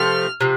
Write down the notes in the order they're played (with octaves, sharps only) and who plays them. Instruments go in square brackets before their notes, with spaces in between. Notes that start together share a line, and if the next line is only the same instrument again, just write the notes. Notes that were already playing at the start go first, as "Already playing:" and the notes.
Already playing: [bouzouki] C3 F3 A3 C4 [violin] F6
[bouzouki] C3 F3